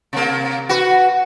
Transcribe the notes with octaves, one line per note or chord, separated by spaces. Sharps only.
C3 A#3
F#4 B4